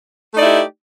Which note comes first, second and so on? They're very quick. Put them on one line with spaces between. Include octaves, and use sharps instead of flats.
A3 D#4 D5 E4 G4